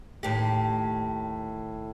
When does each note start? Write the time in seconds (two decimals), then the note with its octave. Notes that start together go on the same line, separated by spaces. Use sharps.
0.23 D#2 A2 G4